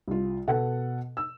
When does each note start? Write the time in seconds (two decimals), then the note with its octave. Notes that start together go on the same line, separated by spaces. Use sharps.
0.08 C2 F4
0.48 B2 A4 F#5
1.17 E6